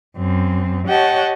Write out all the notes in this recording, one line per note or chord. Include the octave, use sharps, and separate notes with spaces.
F#2 C4
G4 C#5 D#5 F#5 G5 A5